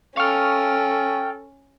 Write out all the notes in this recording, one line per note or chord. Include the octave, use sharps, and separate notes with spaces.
C#4 A4 F5 G5 C#6 F6